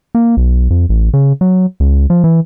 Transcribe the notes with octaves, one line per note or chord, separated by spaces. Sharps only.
A#3
B1
F2
A1
C#3
F#3
C#2
F3
E3